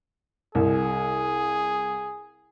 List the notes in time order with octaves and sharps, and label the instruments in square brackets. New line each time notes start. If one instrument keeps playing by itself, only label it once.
[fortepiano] C2 [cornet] G#4